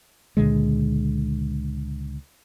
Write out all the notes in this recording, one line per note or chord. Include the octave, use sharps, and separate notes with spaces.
C#2 A#2 D3 G#3